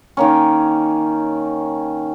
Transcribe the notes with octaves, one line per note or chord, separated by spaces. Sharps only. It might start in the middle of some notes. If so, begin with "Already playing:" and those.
D#3 A#3 C#4